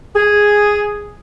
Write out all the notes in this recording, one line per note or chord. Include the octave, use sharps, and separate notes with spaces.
G#4